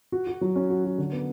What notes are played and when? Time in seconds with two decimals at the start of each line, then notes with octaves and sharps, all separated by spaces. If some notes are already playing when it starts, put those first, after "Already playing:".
0.12 F#4
0.27 F#4
0.41 F#3
0.56 C#4
0.70 F#4
0.84 F#4
0.98 D3
1.12 B3